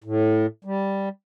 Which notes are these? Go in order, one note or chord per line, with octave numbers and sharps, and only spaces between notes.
A2
G3